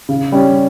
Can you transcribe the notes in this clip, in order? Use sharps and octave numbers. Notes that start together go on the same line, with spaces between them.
C#3
G3 C#4